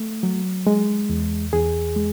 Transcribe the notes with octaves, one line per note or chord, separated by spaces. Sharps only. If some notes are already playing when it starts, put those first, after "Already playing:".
Already playing: A3
F#3
G#3
E2
E2 G#4
G#3